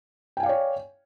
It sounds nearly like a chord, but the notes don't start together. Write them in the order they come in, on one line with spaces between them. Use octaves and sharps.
G5 G#5 F5 D5 C#5